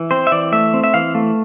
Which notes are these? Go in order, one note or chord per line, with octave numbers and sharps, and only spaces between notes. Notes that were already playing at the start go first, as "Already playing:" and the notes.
Already playing: E3
C4 C5
E5
E3 D5
A3 E5
C4
E5
E3 F5
A3